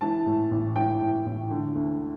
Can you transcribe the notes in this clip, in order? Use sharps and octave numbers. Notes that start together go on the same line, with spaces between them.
E3 A5
A2
A1
E3 G5
A2
A1
D3
D2